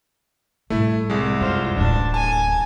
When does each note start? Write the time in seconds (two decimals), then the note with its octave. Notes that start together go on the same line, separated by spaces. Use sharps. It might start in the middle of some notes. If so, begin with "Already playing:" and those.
0.70 A2 G3 A3 E4
1.10 C2 G#3
1.41 F#2 F4 C5
1.76 D1 A1 D4 A5
2.14 G#5 A5